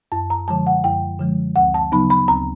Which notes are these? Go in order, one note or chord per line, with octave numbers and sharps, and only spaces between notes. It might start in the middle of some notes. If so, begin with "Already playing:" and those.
F#2 A5
A#5
D3 F3 G#3 A5
F#5
F#2 G5
D3 F3 G#3
D2 F#5
A5
C#3 F#3 B3 D#4 B5
B5
D2 A#5